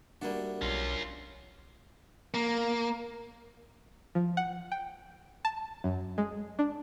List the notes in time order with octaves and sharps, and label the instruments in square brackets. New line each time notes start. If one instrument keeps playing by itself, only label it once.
[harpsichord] G3 A3 F#4 [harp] A#3 D4
[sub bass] B1 [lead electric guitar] C#4 F4
[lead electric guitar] A#3
[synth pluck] F3
F#5
G5
A5
F#2
G#3
D4